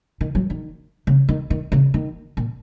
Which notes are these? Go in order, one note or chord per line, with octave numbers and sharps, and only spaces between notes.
D#3
F#3
D#3
C#3
D#3
D#3
C#3
D#3
A#2